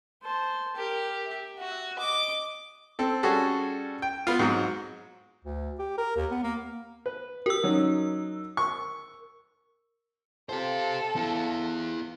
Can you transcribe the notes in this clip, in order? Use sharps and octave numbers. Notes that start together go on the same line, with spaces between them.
C5 A5
G4 A#4
E5
F#4
D#5 D6
C4 A4
G3 C#4 F#4 G#4 A4
G5
B3 F4
G#2 F#3 G#3 C4
D2
G4
A#4
D#2
B3
A#3
B4
G4 A#4 E6
F#3 C#4 D#4
C#6
C4 F4 G4 A4 C5 F5
B3 E4